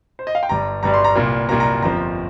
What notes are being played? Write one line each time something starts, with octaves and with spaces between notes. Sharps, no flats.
C5
D#5
F5
G5
G1 G2 G3 A#5
G1 G2 G3 A#5
C6
A#5
C2 A#2 A#3
C2 A#2 A#3 A#5
A#5
G1 F2 F3 A#3 A#5